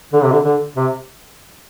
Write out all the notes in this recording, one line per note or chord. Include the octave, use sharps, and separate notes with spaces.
D3
C3
D3
D3
C3